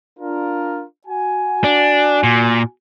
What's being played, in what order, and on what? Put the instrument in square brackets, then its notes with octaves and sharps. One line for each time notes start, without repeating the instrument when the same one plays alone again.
[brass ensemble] D4 F4 A#4
F#4 G#5
[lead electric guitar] D4
A#2